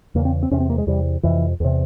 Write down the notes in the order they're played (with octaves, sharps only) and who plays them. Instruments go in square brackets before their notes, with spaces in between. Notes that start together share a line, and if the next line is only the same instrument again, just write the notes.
[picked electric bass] E2 C#3 A#3
C4
C4
E2 C3 C#4
C4
A#3
G#3
E2 C3 G3
F2 C3 E3
E2 C3